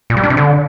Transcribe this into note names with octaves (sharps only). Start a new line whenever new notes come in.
A#2
G3
D4
C3
D3